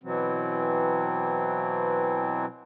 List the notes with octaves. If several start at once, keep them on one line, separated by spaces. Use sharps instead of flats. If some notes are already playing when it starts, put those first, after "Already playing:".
B2 E3 F#3 C4